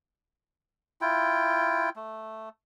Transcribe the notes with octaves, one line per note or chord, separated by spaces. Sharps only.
E4 F4 G5
A3